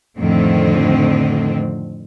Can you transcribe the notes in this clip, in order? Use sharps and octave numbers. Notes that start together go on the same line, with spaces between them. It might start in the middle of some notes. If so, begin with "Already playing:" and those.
F2 A2 D3 D#3 C4